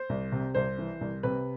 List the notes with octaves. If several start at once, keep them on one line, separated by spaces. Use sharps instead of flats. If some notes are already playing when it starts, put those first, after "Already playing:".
Already playing: C5
C2
C3
C2 C5
E3
C2
C3 B4